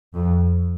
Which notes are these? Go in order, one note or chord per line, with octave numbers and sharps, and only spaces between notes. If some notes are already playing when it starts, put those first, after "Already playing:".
F2